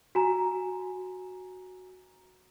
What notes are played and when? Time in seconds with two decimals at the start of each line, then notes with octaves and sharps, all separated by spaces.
0.15 F#4 G#5 A#5